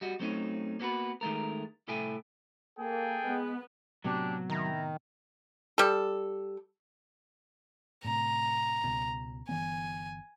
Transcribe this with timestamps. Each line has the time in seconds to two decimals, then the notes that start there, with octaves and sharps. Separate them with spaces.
0.01 G3 F#4 D#5
0.20 F#3 A3 C4 C#4 D#4
0.80 A#3 B3 F#4 A4 B4
1.21 D#3 G#3 A3 A#4
1.88 C2 A2 A4 E5 G5 G#5
2.78 A#3 G#4 A4 G5
3.24 G#3 B3
4.04 A2 C3 F#3 B3 D4 G4
4.50 D#3 E4 A#5
5.78 G3 A4
8.05 A2 C3 A#5
8.84 C#2 B2
9.49 G1 E3 B3 G#5